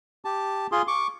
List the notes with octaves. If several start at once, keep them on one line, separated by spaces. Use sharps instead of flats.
G4 A5
F4 G#4 C6
C#6 D6